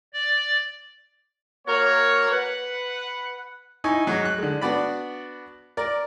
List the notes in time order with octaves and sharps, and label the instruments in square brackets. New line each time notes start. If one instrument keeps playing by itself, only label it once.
[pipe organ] D5
[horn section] A#3 F#4 A#4 C#5
B4 F#5
[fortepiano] D#4 E4 G#5 C#6
G#2 F#3 D#4
F#6
D3 G#3
B3 D4 F#4 D5 B5
A#4 D5